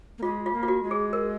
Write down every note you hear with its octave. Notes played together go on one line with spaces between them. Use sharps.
A#3
G#3 F4
F4
A#3
F4
F#4
G#3
G#4
A#4